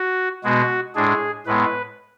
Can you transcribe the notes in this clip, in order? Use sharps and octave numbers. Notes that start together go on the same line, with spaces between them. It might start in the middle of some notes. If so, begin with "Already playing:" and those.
Already playing: F#4
B2 G#3 B3 F#4
A2 G#3 D4 G#4
A2 G#3 B3 B4